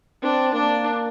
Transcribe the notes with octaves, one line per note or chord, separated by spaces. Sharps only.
C4 D4
A#3 D4